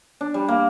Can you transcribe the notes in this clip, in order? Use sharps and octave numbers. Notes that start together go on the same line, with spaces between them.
D4
G3
A#3